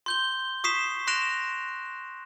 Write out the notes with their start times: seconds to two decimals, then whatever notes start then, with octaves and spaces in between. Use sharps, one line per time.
0.06 C6 G6 G7
0.64 C#6 D#6 B6 C7 E7
1.07 C6 F#6 A#6 D7 E7 F7